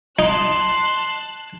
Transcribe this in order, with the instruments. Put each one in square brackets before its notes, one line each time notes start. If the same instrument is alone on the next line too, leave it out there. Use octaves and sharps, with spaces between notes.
[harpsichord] D#4 [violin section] A5 F#6 [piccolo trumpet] C6